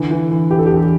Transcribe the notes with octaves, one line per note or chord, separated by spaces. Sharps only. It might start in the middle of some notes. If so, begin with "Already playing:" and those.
Already playing: D3 E3
E3
E3
E3 G4
A4
G4
E2